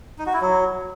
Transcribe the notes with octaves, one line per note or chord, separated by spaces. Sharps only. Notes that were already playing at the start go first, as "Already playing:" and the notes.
D#4
F#4
E4
F#3